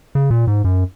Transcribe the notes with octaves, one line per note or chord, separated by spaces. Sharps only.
C#3
A#2
G#2
F#2